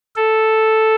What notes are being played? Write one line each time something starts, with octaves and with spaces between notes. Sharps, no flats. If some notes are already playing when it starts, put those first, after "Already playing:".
A4